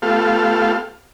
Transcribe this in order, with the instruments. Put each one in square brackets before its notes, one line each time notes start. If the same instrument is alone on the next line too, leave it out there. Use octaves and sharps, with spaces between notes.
[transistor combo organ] A3 B3 F4 G4 A4 F5